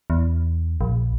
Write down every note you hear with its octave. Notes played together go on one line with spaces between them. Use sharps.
E2
A#1